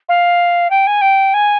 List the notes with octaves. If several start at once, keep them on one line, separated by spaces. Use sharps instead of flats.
F5
G5
G#5
G5
G#5